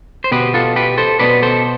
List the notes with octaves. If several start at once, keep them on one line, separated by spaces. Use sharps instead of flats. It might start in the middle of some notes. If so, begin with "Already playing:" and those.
C5
B2 B3 G4 B4
F4 A4
G4 B4
A4 C5
B2 B3 B4 D5
A4 C5